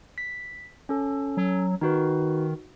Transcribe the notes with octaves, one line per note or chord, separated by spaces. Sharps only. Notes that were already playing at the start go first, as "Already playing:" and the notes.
B6
C#4 A4
F#3
D#3 D#4 F#4 B4